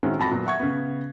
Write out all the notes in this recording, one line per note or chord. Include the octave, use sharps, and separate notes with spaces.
A2 D#3 G#3 C4 C#4 F#4
F2 F#4 A5 B5 A#6
A#2 F#3 B3
E5 F#5 C#6 G#6
C#3 B3